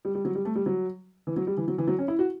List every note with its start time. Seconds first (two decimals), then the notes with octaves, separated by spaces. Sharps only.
0.05 G3
0.15 G3
0.25 F#3
0.35 G3
0.45 A3
0.55 G3
0.66 F#3
1.27 E3
1.36 F#3
1.47 G3
1.57 E3
1.68 F#3
1.78 E3
1.87 F#3
1.99 C#4
2.08 E4
2.19 F#4